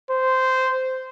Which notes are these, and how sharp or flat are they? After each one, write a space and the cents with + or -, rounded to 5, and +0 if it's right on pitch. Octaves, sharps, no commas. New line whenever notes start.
C5 -10